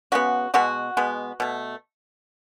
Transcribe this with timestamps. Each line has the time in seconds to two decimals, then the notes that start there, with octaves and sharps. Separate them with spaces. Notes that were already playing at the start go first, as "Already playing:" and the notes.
0.12 C#3 G#3 B3 F#4
0.54 B2 G#3 B3 F#4
0.97 B2 G#3 B3
1.40 B2 A3